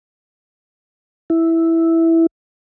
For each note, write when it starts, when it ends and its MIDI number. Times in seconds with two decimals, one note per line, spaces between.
1.30 2.26 64